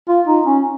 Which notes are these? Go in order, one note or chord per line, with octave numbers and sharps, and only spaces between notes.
F4
D#4
C#4